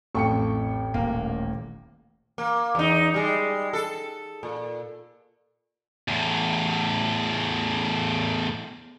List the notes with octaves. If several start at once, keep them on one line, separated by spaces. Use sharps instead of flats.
A1 F2 A4 G5 C#6 C#7
D#1 A#3
A#3
E2 D#4
G3 G#3
A4
A#2
E2 A2